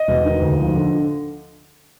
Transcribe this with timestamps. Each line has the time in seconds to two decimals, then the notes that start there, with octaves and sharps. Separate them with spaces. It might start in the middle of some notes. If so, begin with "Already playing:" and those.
Already playing: D#5
0.08 E1
0.25 D#3
0.41 D2
0.59 F3
0.75 D3